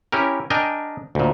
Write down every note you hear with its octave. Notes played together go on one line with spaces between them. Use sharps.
C#4 E4 G4 A#4
D4 A#4 D#5 G5 G#5
D2 A#2